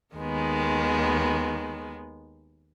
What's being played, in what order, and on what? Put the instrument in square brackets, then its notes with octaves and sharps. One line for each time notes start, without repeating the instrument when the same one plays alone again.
[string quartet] D#2 D#3 G#3 B3